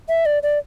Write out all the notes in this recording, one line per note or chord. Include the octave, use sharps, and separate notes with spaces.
E5
D5
D5